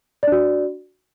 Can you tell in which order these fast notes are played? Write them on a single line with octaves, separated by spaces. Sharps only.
D5 D4 F#4